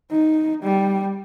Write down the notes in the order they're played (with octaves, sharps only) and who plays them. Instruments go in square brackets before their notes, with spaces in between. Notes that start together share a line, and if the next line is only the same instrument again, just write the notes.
[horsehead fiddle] D#4
G3